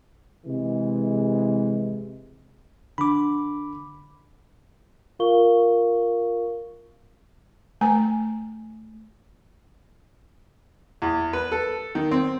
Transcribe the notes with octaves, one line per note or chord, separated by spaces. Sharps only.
C3 E3 G#3
D3 B5 D6
F4 A#4 F5 C#6 G7
A3 G#5 A#5
E2
B4
A4
D#3
C4